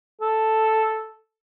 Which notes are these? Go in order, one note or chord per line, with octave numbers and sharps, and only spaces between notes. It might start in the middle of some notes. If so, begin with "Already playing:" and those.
A4